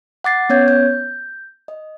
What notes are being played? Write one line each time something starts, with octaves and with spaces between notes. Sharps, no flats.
F#5 D6 A6 C7
B3 C#4 C#5 G6 G#6
G6
D#5